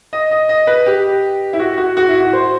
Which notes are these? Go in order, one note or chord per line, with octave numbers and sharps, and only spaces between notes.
D#5
D#5
D#5
B4
G4
E4
F#4
F#4
F#4
E4
F#4
C5